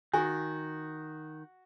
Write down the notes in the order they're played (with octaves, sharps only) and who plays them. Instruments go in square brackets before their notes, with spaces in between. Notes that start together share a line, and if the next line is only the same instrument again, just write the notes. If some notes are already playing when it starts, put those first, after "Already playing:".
[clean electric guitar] D#3 [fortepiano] F#4 [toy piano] G#5